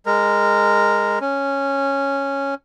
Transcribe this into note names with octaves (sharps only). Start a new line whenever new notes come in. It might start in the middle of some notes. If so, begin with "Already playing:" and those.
G#3 A#4
C#4